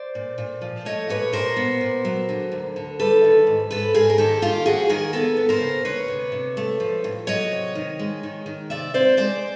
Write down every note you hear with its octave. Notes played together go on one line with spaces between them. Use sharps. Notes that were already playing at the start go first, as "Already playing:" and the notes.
Already playing: C5 D5
A#2
A#2
F3
A3 C#5 D#5
A#2 B4 C#5
A#2 A#4 C5
B3
A#2
F#3
D3
D2
D3
G3 A4 B4
D#3
G#2
G#2 A4 B4
G#2 G#4 A#4
A#4
D#3 G4 A4
D#3 F4 G4
F2 F#4 G#4
D#3 G#4 A#4
B3 A4 B4
B3
A#4 C5
C#3
D2 B4 C#5
C3
C3
A3
F3
A2
F#3 C#5 D#5
C3
D#3
G#3
D#3
D#3
C3 D5 E5
C4 C5 D5
G#3 C5 D5